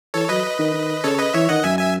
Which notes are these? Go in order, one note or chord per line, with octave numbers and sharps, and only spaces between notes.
E3 A4 C#5
F#3 B4 D#5
D#3
D#3
C#3 A4 C#5
B4 D#5
E3 C#5 E5
D#3 D#5 F#5
F#2 E5 G#5
E5 G#5